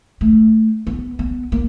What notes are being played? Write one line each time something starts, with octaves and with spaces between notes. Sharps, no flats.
A3
B3
B3
A#3